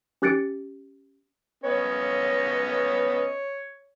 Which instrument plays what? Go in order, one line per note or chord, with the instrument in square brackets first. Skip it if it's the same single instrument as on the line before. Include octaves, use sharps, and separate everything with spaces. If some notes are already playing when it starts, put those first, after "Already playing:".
[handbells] C#4 G4 F#6 A6 C#7 D7
[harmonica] B3 C#4 D#5 [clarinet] C#5